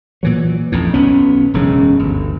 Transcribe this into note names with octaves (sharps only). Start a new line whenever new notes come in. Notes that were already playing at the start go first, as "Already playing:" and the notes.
A#2 E3 F#3
A1 F2 A2
B1 B2 B3 C#4
E1 F#2 C#3 C#4
G1 D2